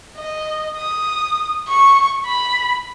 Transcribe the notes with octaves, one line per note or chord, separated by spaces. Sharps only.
D#5
D#6
C#6
B5